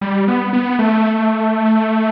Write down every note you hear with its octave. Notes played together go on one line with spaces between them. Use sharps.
G3
B3
B3
A3